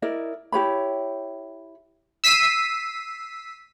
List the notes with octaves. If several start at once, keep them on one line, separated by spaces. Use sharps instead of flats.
E4 A#4 D5 D#5
E4 G4 C#5 B5
E6 B6 C7 D#7